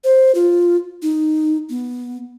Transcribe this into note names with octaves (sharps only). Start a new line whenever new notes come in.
C5
F4
D#4
B3